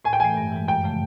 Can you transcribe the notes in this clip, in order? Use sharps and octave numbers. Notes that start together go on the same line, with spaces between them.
A2 G#5
G5
E3 A3 G#5
G2
E3 G#3
F#2 G5
C#3 F3 A3